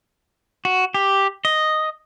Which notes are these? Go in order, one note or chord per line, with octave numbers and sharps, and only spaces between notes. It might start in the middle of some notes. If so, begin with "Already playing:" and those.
F#4
G4
D#5